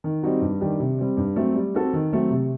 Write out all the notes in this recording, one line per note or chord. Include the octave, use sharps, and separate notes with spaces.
D#3
G3 C4 D#4 F#4
G2
D#3 G3 D4 G4
C3
G3 C4
G2
F#3 A3 C4
G3
C4 F#4 A4
D#3
F#3 A3 C4
C3